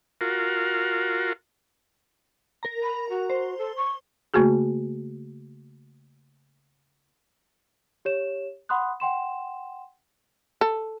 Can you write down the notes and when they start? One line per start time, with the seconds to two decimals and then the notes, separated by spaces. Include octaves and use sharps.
0.21 F4 F#4 A#4
2.63 A#4 A#5
2.82 B5
3.09 F#4
3.30 C5
3.58 A4
3.76 C#6
4.34 C#3 A3 A#3 F#4 G#4
8.05 G4 C#5 E7
8.69 F#5 B5 C6 D#6 F#6
9.00 F#5 G5 C6 E7
10.61 A4